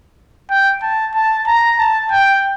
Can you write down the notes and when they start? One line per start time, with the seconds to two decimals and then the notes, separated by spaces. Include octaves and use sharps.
0.50 G5
0.83 A5
1.15 A5
1.47 A#5
1.79 A5
2.12 G5